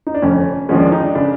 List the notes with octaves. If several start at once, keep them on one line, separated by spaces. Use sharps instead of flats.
D#4
D4
F1 F2 D3 C#4
D#2 D3 F3 G#3 C#4
D4
D#4
D4
C#3 D4